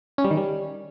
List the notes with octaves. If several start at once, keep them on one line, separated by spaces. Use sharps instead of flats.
C#4
G3
D#3
G3